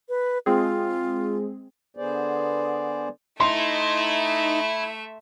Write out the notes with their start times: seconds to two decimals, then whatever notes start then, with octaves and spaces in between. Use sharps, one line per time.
0.09 B4
0.46 G#3 C4 F4 G#4
1.97 D3 B3 G#4 C5 D5
3.40 A3 D#4 E4 E5 C6